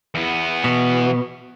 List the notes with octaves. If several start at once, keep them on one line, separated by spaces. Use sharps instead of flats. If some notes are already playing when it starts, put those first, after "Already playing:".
E2 B3
B2